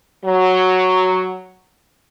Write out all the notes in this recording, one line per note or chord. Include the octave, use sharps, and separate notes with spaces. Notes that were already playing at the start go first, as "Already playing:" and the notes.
F#3